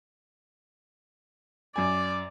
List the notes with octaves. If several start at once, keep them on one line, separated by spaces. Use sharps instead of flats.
F#2 D5 G#5